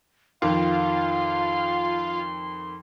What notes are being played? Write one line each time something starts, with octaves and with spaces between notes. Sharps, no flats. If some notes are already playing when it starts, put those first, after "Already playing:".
F2 D#3 F4 F5 C6